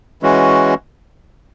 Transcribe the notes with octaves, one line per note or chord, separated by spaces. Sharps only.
E3 G#3 C#4 F#4